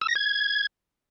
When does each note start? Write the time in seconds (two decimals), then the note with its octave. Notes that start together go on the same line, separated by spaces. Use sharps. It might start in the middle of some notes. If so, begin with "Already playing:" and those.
0.01 E6
0.08 A#6
0.15 G#6